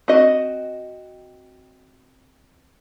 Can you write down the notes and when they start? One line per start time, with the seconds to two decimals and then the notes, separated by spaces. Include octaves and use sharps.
0.08 C4 F#4 D#5